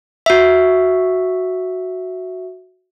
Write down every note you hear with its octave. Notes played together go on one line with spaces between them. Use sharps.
F#4 E5